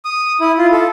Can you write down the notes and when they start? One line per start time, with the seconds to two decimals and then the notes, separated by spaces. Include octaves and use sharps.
0.05 D#6
0.41 E4
0.58 F4
0.72 A4